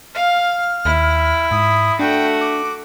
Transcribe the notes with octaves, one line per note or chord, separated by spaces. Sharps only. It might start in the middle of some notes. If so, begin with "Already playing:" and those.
F5 F6
D#2 E4
G#2 D#6
A3 D4 F#4 G5
D6